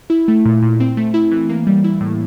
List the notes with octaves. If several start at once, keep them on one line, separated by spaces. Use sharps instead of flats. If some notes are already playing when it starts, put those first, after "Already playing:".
E4
A3
A#2
A#2
C4
A3
E4
E3
A#3
G3
E4
A2